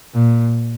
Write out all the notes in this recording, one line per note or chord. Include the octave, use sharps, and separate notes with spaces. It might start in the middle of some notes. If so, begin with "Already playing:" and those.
A#2